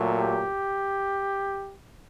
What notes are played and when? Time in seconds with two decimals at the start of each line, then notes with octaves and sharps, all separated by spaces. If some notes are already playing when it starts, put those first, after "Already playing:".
Already playing: A#2 F#3 A3
0.18 G4